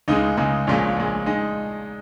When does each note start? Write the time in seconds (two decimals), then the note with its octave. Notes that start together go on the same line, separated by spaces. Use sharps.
0.08 C#2 C#3 G#3 D#4
0.37 C#2 C#3 G#3
0.67 A#1 A#2 G#3 C#4
0.96 A#1 A#2 G#3
1.26 G#3 D#4